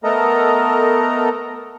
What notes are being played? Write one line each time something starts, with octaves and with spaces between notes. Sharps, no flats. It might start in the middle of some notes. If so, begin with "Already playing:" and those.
A3 B3 A4 A#4 D#5 A#5